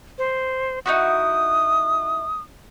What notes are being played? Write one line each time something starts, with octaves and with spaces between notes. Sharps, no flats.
C5
D#4 E4 F#4 D#6